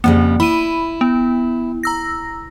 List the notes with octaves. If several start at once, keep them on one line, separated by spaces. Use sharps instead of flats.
F2 C#3 G3 A#3
E4 B5 D#7
B3
A#5 E6 A#6